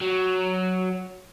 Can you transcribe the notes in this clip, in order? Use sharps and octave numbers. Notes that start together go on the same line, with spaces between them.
F#3